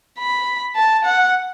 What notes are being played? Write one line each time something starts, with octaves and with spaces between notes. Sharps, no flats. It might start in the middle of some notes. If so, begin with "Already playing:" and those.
B5
A5
F#5